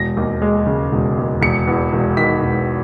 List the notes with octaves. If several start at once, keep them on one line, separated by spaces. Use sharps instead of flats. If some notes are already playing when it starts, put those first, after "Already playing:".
Already playing: E1 A#6
D#2
G#3
C#3
E1
D#2
E1 C#7
E2
E1
D#3 B6
E1